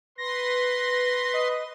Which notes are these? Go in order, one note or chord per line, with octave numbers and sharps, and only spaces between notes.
B4 C6 A#6
D#5